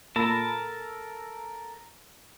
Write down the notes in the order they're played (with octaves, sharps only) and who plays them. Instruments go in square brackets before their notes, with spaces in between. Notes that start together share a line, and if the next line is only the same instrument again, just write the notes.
[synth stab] A#2 B5 [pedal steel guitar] A4 A#4 A5